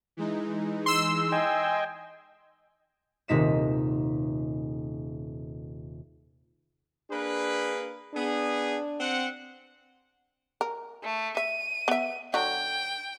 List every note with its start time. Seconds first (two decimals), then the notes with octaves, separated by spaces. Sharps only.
0.17 E3 G#3 D#4
0.86 C6 E6
1.32 D#5 G5 G#5
3.28 D#1 C3 D#4 B6 E7
7.11 A#3 D4 G#4 B4
8.14 B3 D4 G#4
9.00 C4 F#5
10.61 A#4
11.04 A3
11.37 E5 D#7
11.88 B3 E5
12.34 D3 F#3 F#4 G5